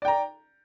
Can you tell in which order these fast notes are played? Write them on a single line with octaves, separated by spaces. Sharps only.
D5 G5 A#5